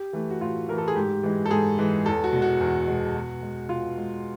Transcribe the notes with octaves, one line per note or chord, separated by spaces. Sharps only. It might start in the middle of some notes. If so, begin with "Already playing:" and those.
Already playing: G4
E3 A3
F#4
A2 F4
E3 A3 A#4
A4
G#4
G#2 G4
E3 G#3
A4
G#2 G#4
E3 G#3
E2 A4
F#4
B2 G#3
F#4
E2
B2 G#3
B2
G#3
B2 F4
G#3